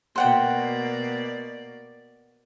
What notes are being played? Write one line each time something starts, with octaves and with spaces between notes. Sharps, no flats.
B2 A#3 C5 D5 F#5 G5